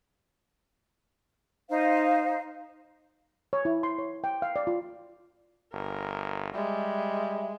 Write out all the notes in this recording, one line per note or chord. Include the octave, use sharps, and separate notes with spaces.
D#4 C5 F5
C#5
E4
C6
C#5
G5
F5
D5
F4
G1 A#4
G3 G#3 E5